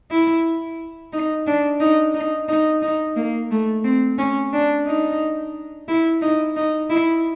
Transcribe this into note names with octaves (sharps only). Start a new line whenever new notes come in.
E4
D#4
D4
D#4
D#4
D#4
D#4
A#3
A3
C4
C#4
D4
D#4
E4
D#4
D#4
E4